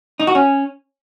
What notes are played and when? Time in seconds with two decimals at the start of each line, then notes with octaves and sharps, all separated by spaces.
0.20 D#4
0.27 F#4
0.35 C#4